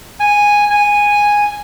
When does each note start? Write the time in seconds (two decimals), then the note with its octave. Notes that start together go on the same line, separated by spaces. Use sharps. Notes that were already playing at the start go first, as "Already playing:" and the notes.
0.20 G#5
0.71 G#5